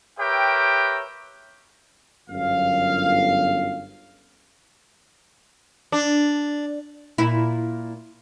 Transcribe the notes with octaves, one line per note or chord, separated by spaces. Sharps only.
G4 A#4 B4 C#5 E5 G5
G1 F#2 F5
D4
A#2 E4